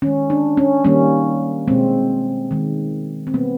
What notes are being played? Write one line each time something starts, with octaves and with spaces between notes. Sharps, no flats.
D#3 G#3 C#4
D4
C#4
D#3 G3 A#3 C#4
B2 G#3 C4
D#3 G#3
C4
B2 G3 A#3 B3